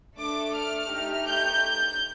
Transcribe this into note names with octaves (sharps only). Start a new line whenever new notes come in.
A3 D4 A4 D6
F6
A3 D#4 G4
G6